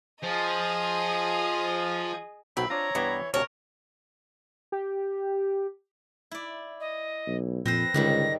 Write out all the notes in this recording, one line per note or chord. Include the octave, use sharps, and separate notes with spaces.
F3 G#4 D#5
B1 F#3 C4 G5 B5
D4 F4 C#5 A#5
G2 E3 B3 D5
D2 C3 A#4 C#5 A5
G4
E4 D5
D#5
B1
F2 A#2 C4 B4 C5 A#6
C#2 G#2 D3 D#3 G3